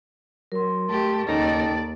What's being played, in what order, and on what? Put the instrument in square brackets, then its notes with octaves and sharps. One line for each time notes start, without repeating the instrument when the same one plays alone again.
[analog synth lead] F#3 [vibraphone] A#4 C6
[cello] A3 G4 [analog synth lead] A5
[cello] D#2 D5 [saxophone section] C#3 C#4 D#4 [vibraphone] A4 G5 [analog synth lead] A5